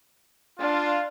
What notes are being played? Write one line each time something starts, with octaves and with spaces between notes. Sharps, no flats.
D4 F4